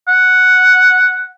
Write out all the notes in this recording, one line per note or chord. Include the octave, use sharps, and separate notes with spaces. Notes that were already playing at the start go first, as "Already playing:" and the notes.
F#5